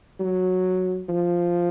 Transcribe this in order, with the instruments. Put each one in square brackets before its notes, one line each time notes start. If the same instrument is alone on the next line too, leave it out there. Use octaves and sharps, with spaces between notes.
[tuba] F#3
F3